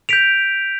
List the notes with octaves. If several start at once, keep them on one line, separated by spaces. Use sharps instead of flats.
G6 B6 D7 F7